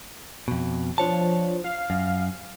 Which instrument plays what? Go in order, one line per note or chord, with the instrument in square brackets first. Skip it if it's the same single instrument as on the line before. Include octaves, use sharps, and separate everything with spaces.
[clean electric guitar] F2 B2
[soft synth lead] F3 [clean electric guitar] D4 C#5 A5
[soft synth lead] F5
[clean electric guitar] F#2